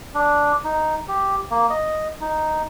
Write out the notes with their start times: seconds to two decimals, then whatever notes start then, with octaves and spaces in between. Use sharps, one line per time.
0.15 D4
0.64 D#4
1.08 G4
1.50 A#3
1.70 D#5
2.21 D#4